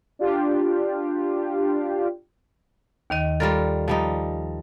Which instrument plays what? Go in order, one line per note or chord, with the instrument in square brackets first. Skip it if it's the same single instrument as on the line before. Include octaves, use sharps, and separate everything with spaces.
[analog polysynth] D4 F4 G4
[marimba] D#2 D#3 D#5
[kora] G3 F4 A#4 [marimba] A4 D5
[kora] F3 G3 D#4